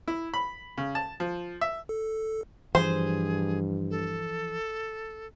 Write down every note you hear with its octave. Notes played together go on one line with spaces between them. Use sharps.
E4
B5
C#3
A5
F3
E5
A4
G2 E3 F3 G#4 C5
A4